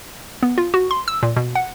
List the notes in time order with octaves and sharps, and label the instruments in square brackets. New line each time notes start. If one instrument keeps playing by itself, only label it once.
[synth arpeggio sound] B3
F4
F#4
C6
E6
A#2
B2
F#5